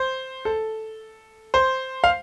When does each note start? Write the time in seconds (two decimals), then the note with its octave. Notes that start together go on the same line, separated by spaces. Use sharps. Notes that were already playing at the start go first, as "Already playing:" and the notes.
Already playing: C5
0.45 A4
1.54 C5
2.04 F5